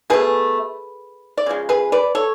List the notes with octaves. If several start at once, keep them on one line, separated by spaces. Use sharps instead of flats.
B2 A3 G#4 B4
D5
C#3 F3 G#3
G#4 B4
B4 D5
A4 C#5